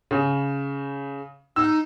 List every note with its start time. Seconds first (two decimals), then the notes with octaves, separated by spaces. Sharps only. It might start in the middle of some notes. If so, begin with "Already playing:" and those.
0.11 C#3
1.56 D#4 E6